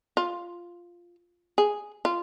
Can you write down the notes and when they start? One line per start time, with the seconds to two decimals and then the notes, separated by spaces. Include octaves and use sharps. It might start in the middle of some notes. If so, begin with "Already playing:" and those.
0.17 F4
1.58 G#4
2.05 F4